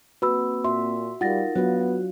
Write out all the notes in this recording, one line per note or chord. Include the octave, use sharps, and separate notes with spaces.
A#3 C4 F#4 B4 B5 E6
A#2 F#4 E5 C6
G3 D#4 F4 A#4 F#5 A6 A#6
F#3 B3 D4 F4 F#4